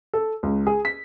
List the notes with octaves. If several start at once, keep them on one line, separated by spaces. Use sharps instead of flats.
A4
C#2
G#4
B6